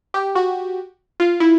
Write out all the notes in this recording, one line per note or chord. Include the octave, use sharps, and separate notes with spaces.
G4
F#4
F4
E4